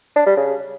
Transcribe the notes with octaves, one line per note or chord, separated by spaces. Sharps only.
D4
G3
C#3